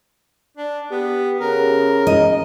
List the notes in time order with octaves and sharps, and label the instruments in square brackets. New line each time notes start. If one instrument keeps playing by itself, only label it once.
[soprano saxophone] D4
[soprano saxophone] B3 [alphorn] G4
[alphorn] C#3 [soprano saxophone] A#4
[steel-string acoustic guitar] D#5